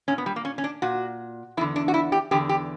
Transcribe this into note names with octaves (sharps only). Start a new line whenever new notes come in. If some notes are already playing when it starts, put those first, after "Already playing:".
A#2 C#4
B3
G3
A#3
C#4
C#4
D4
A#2 F#4
E2 D3 E4
D4
F#4
E4
G4
E2 D3 G4
G4